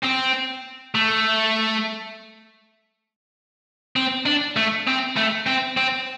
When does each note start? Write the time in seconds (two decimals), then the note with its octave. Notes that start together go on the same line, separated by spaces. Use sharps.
0.04 C4
0.95 A3
3.96 C4
4.26 D4
4.56 A3
4.87 C4
5.16 A3
5.46 C4
5.77 C4